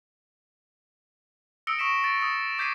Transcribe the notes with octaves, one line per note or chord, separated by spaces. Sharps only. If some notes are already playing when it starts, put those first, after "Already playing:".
D#6 E6 A#6 C#7 D7 G7
C#6 D#6 A#6 B6 D7 E7
A6 D7
D#6 A6
D6 G6 G#6 B6 C7 D#7